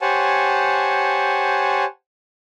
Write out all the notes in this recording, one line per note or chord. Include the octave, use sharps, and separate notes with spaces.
G4 C5 C#5 F#5 G#5 A5